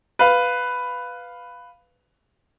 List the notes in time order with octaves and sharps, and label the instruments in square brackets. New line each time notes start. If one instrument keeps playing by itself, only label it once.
[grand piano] B4 F5